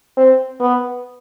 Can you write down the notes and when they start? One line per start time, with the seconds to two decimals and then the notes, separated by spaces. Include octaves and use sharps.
0.17 C4
0.60 B3